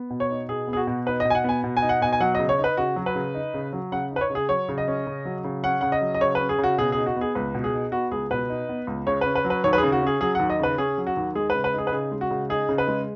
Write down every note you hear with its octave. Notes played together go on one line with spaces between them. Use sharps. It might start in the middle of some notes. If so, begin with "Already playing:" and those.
Already playing: B3
B2
C#5
D#4
B2 G#4
B3
G#4
F#4
B2
D#4 B4
B2 D#5
G#5
F#5
B3 G#5
B2
G#5
D#4
F#5
B2 G#5
G#5
F#3 F#5
C#3 D#5
C#5
D#4
B4
C#3 F#4
F#3
B4
C#3
D#4
C#3
F#3
C#3 F#5
D#4 B4
C#5
C#3
G#4
F#3 C#5
C#3
D#5
C#4
C#3
F#3
C#3
C#4 F#5
C#3 F#5
D#5
F#3
D#5
C#3 C#5
C#4 B4
G#4
C#3
F#4
B2 G#4
D#4 G#4
F#4
B3
G#4
C#2 B4
B2
G#4
D#4
B3 F#4
C#2 G#4
B2 B4
D#4
B3
C#2
C#3 C#5
C#4 B4
B4
F#3
B4
D#2 C#5
B4
G#4
C#3
F#4
C#4
G#4
F#3 G#4
D#2 F#5
D#5
C#3 B4
C#4 G#4
F#3
F#4
D#2
G#3 G#4
B4
C#3
B4
D#4 G#4
B4
C#3 G#4
G#3
F#4
C#3
D#4 G#4
C#3
B4
G#3